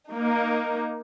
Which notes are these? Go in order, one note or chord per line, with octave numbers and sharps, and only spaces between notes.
A#3 D#4